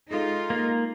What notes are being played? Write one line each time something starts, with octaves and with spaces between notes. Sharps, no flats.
G#3 D#4 F4 G#4 A4 D#5
A#3